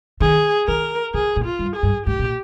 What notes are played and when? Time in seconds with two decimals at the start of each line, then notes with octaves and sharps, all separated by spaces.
0.21 D#3 G#4
0.67 D#3 A#4
1.14 C#3 G#4
1.36 A#2
1.45 F4
1.59 G2
1.76 G#4
1.83 G2
2.06 G#2 G4
2.19 A#2